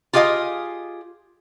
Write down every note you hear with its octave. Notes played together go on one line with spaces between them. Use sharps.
F4 G4 G#4 D#5 F5